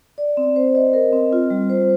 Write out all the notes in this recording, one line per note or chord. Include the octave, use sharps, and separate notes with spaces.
D5
C4
C5
D#5
A#4
C4
F4
G3
C5